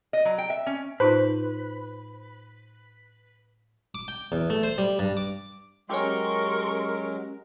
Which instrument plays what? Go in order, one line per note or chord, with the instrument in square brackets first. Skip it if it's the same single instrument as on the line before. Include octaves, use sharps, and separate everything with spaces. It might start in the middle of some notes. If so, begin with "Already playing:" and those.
[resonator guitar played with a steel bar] D#5
F#3
G5
E5
C#4
[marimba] A2 D#4 F4 [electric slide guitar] B4 [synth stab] C5
[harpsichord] D6
G5
E2
A3
C5
G3
G2
D6
[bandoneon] F#3 G#3 [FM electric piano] C#4 G4 [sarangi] A#4 [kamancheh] C6 C#6